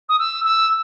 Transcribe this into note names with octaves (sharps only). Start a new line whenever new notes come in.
D#6
E6
E6